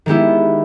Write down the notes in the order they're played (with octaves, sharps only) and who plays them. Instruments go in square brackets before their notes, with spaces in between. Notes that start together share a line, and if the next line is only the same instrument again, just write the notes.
[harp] D#3 G#3 B3 E4 G4